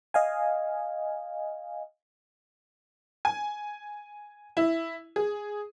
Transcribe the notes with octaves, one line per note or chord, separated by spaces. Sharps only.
D#5 F5 G#5
G#5
E4
G#4